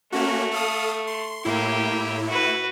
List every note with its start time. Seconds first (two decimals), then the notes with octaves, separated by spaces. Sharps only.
0.12 A3 A#3 C#4 F#4
0.51 A4 F5 D#6
1.07 C6
1.45 A2 A#3 E4 G4
2.28 F#4 B4